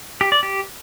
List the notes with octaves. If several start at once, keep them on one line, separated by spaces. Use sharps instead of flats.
G4
D5
G4